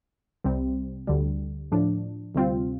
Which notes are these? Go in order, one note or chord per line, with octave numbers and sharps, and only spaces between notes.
C2 C3 G3 C4
D2 D3 G3
A2 F3 D4
D2 C3 G3 C4 F4